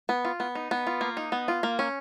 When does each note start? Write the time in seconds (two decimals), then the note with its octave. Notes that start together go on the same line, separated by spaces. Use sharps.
0.09 B3
0.25 F4
0.40 B3
0.55 D#4
0.71 B3
0.87 F4
1.01 A#3
1.17 D#4
1.32 B3
1.48 F4
1.63 A#3
1.79 C#4